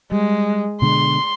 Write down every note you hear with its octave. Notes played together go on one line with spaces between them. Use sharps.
G3 G#3
B2 D3 G#3 C6